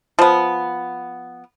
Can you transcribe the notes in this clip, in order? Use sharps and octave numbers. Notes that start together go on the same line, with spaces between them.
F3 B3